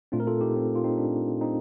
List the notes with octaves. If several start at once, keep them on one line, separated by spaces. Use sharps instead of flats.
A#2 A3 C4 D4 F4
A#4
F4 A4
D#4 G4
C4
F4
C4 D#4
D4
C4 D#4